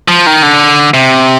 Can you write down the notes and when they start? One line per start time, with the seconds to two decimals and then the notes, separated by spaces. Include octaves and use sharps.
0.08 F3
0.27 D#3
0.43 D3
0.94 C3